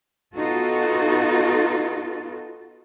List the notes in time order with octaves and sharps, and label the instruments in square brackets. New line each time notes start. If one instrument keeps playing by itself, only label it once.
[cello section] B3 D#4 F4 F#4 A4